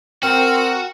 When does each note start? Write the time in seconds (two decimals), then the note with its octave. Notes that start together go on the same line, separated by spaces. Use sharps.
0.23 C4 F#4 A#4 G5 F6